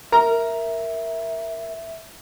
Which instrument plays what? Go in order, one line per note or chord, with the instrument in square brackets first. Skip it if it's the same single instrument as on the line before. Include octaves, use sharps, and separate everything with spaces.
[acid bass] A#4 [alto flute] E5 [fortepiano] A#5